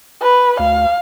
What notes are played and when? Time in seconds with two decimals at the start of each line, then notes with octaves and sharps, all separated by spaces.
0.22 B4
0.59 D2 F5